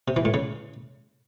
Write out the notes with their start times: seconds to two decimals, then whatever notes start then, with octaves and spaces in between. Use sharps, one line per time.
0.08 C3
0.16 E3
0.25 A2
0.34 C#3